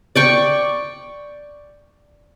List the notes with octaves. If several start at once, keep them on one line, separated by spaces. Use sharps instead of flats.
D5 G5 C#6